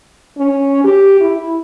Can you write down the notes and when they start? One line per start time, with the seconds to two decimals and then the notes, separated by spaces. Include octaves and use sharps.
0.38 C#4
0.84 G4
1.21 E4